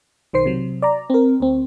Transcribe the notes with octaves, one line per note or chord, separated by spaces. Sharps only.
B1 D#3 C5 C7
C3 F#3
D5 A#5
C4 A#4
D2 C4